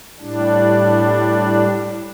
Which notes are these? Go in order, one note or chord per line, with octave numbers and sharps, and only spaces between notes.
A2 G3 D4